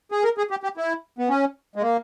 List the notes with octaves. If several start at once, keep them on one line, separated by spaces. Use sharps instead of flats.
G#4
A#4
G#4
G4
G4
E4
B3
C#4
G#3
A#3